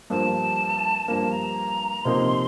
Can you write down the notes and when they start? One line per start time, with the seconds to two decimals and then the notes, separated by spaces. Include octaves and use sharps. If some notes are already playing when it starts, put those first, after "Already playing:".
0.10 G2 F3 A#3 A5
1.08 G2 F3 A#3 A5
1.32 A#5
2.04 C3 F3 A#3 D#4 C6